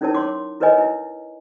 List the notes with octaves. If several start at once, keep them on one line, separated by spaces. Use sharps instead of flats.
C#4 D#4 E4 A#4 C#5 A5
C#5 C6 D6
E4 A#4 B4 C#5 D#5 G#5
E4